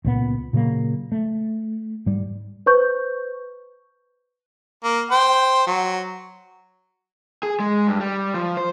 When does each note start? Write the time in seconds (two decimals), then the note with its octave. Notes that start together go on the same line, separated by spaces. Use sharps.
0.05 C#2 A#2 G3 B3
0.53 A#2 C#3 F#3 A#3
1.12 A3
2.06 G#2 G3
2.66 B4 C5 C#6 G6
4.84 A#3
5.11 C5 G5
5.67 F#3
7.43 G#4
7.60 G#3
7.87 G2
8.00 G3
8.34 F3
8.57 C5